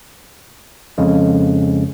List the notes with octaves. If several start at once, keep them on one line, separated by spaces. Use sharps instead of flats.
F2 C#3 G#3